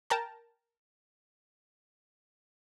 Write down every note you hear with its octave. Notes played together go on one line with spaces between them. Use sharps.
A#4 G5 A5 A#5